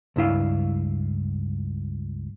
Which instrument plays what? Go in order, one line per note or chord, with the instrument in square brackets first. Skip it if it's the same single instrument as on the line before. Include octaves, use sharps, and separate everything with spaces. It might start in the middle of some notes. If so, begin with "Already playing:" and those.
[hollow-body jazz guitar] C#2 G2 E4 F5